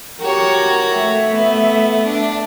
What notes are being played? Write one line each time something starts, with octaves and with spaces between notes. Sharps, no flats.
F#4 G4 A#4 C#5
A3 E5
B3
D4